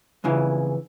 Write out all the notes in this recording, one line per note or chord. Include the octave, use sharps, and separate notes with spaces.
F2 C#3 E3